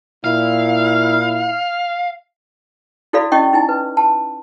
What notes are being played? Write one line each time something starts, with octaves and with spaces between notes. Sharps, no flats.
A#2 E4 F5
E4 F#4 A4 D5 F5 B5
C#4 E4 D#5 G5 C#6
D#4 E4 G#5
B4
A5